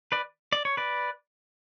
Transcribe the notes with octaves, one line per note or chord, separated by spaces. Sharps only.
B4 D5
D5
C#5
B4 D5